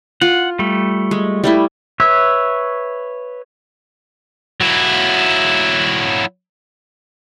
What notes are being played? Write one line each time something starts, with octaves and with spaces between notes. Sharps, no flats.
F4 F#5
G3 A3
G#3
G3 A3 E4
B4 C#5 E5
F#3 E4